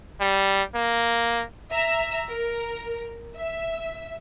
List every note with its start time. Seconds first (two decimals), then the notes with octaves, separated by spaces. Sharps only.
0.20 G3
0.75 A#3
1.71 E5 A#5 E6
2.30 A#4
3.37 E5